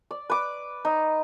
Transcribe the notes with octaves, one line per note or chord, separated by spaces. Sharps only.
D5
B4 D6
D#4